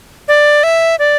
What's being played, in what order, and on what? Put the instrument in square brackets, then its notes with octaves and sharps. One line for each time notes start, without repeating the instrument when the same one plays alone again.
[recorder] D5
E5
D5